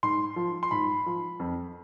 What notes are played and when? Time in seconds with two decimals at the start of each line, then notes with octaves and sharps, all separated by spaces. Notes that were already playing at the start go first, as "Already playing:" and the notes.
0.03 G#2 C6
0.36 F3
0.63 C6
0.71 G#2 B5
1.06 F3
1.39 F2